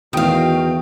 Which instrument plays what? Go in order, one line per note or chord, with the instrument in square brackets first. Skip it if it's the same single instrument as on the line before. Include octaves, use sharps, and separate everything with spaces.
[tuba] E2 [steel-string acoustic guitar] D#3 F5 [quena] F#4 [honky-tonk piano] G5 D#6